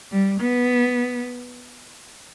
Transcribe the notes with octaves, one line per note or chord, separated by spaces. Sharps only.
G3
B3